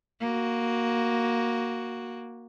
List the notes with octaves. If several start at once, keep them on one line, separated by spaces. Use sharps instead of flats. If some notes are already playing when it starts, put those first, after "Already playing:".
A#3 F#4